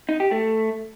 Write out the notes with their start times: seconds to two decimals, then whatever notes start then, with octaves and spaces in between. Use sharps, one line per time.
0.09 D#4
0.20 G4
0.31 A3